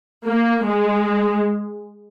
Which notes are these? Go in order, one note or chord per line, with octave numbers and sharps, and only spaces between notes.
A#3
G#3